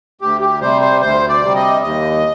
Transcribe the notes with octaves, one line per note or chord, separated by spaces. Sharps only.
D2 G4
G4
C3 G3 C5
C5
D2 C5
D5
C3 G3
D#5
D#2 D#5